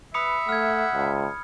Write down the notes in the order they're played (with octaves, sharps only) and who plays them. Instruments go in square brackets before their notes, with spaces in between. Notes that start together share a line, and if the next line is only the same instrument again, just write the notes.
[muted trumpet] B4 [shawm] E5 [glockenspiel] B5 D#6 C#7
[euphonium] A3 [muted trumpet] F#5 [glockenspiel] F6 G#6
[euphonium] C#2